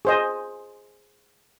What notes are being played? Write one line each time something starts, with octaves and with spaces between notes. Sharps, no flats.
G#4 C5 D#5